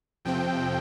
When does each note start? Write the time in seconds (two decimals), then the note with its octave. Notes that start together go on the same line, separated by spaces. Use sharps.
0.25 F2 C3 F3 C4 G5